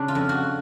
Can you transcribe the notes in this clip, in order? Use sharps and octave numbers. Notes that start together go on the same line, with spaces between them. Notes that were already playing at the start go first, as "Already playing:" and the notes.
Already playing: C#3 D4
F4
F2
F#4